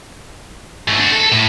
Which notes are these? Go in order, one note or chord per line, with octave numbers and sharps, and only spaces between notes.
G#2 A3
D4 F#4
A4
A2